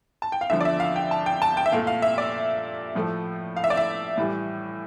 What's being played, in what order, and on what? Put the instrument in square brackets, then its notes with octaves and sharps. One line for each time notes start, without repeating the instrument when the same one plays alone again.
[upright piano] A5
G5
F5
E2 D3 F3 E5
D5
E5
F5
G5
A5
G5
A5
G5
E5
A#2 A3 F5
F5
E5
D5
A2 F3 A3
F5
E5
D5
E5
A2 E3 G3